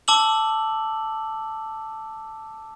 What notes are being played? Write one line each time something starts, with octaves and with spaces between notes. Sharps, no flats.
A5 D6 E6 F#7